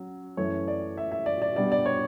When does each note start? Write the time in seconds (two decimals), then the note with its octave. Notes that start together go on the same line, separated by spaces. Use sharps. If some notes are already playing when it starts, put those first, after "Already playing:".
Already playing: F#3 C#4
0.37 F#2 E3 A3 C#4 C#5
0.68 D5
0.97 E5
1.12 E5
1.26 D5
1.42 D5
1.56 B2 G3 D4 D5
1.72 D5
1.86 C#5